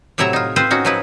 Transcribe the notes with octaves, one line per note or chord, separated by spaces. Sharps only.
A2 C3 F#3 E4 E5 A#5
D#4 F4
C4 F4 B4 C5
C#4 D#4 F#4
F3 F#3 D#4 E4 B4